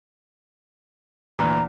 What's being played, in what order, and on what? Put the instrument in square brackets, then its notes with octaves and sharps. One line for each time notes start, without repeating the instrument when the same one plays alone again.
[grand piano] D2 A#2 E3 [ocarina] A#5